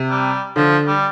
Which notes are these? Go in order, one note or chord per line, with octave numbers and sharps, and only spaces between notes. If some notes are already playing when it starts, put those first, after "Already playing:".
Already playing: C3
G3
D3 F3
G3